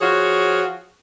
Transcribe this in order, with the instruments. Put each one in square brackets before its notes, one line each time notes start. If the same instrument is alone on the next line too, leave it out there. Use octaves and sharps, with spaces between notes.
[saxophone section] F3 F4 F#4 G#4 C#5 F#5